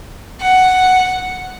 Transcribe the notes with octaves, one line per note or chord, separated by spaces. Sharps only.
F#5